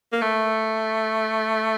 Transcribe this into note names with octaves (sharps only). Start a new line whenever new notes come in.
A#3
A3